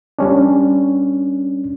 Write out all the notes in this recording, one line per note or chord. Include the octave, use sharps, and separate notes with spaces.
G3 C#4 D4